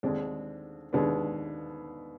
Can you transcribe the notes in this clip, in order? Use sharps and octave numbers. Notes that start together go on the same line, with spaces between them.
D#2 D3 G#3 C4 D4
D#2 D3 G#3 B3 D4